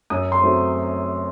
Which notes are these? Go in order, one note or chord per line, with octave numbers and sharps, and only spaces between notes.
F#2 D#6
C6
F#3 A3 C4